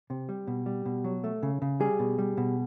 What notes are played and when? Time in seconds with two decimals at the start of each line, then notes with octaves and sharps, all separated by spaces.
0.10 C3
0.29 G3
0.47 B2
0.66 G3
0.85 B2
1.04 F#3
1.24 A3
1.43 C#3
1.62 C#3
1.80 G3 G#4
1.99 B2
2.18 G3
2.37 B2